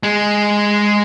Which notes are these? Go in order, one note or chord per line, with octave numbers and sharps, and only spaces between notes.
G#3